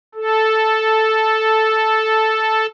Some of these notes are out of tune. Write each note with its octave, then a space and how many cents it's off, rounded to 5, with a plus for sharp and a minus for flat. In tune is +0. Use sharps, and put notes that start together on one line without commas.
A4 -5